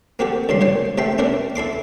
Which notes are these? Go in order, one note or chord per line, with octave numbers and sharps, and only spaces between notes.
A#3 C4 F#4 G4 A4
C#2 G2 C#3 C6
A#2 C5 C#5
C3 A3 A4 G5 C6
C#4 D4 E4 A#4 B4
E4 A4 C6 D6